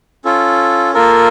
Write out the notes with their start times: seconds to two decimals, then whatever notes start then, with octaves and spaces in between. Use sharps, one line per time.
0.25 C#4 F4 A4
0.94 A#3 F4 A4 A#4